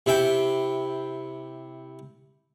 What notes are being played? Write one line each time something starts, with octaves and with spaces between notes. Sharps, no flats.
C3 E4 G5